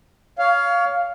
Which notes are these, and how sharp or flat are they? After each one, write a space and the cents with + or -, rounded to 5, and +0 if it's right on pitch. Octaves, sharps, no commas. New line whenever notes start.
C#5 +25 F5 +0